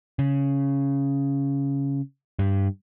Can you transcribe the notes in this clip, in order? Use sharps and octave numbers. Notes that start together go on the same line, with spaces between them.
C#3
G2